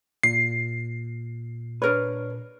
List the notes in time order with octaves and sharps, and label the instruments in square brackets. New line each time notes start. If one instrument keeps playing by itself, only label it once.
[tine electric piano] A#2 [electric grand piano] C7
[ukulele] D4 A#4 C#5 [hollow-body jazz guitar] B4